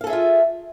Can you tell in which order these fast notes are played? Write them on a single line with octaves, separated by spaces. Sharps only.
F5 A4 G#4 E5 F4